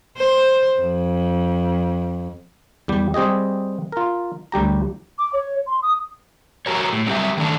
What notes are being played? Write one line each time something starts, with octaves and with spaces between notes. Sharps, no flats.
C5
F2
E2 G3 G4
G3 C4 G4 G#4 D#5
F4 A#4
D2 G3 G4 A#5
D6
C#5
C6
D#6
F#4 G4 A#4 C#5
A2
F#3 G3 C4 F4 G4 E5
D#3 A3 C#4 D4